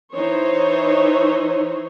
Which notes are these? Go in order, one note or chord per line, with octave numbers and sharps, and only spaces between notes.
E3 D#4 C5 C#5